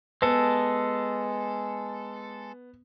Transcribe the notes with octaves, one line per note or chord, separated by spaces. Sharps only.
G#3 B3 A4